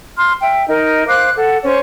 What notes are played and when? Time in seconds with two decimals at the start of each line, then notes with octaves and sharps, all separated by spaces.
0.17 C6 F6
0.41 E5 G5
0.68 D#4 A#4
1.08 C5 F5 D6 F#6
1.37 A4 F#5
1.63 C#4 C5 C#5 G#5